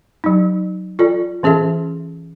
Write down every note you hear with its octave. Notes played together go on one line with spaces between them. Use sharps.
F#3 D#4
F4 A4 D5
E3 C#4 G#4 A4 E5